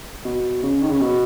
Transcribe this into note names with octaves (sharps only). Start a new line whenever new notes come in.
B2
C#3
D#3
C#3
B2